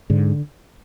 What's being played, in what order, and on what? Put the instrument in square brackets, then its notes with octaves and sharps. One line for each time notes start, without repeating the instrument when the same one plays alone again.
[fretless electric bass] G#2 D3